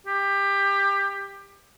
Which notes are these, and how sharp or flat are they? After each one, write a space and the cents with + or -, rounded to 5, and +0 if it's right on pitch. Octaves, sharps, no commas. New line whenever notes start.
G4 +20